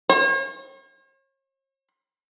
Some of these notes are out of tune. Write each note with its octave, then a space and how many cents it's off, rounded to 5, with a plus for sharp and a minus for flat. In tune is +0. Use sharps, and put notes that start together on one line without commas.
C#5 -45